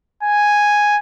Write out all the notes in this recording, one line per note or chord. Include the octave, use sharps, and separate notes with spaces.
G#5